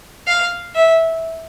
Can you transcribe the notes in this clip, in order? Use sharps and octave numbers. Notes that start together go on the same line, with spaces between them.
F5
E5